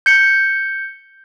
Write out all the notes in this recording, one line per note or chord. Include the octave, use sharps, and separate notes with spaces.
G6 C#7